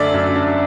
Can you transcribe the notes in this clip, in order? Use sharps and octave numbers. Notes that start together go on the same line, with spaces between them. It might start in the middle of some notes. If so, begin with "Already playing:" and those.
Already playing: F#2 D3 A3 D4 D5 E5
F#2
D4